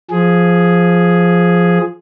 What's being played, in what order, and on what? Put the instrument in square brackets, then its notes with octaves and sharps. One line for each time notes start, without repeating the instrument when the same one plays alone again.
[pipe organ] F3 G#4